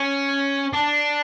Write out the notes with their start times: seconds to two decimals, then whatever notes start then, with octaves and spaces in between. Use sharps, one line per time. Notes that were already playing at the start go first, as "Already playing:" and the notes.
Already playing: C#4
0.73 D4